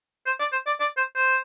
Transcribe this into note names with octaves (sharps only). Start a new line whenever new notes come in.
C5
D5
C5
D5
D5
C5
C5